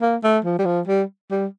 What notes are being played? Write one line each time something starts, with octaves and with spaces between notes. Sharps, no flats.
A#3
A3
F3
G3
F3
G3
G3